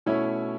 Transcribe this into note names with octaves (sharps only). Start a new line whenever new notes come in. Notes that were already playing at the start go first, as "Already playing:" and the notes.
B2 A3 C#4 E4 C#5